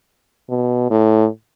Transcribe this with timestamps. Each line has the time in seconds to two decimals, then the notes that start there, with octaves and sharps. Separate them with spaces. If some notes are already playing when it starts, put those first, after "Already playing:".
0.50 B2
0.91 A2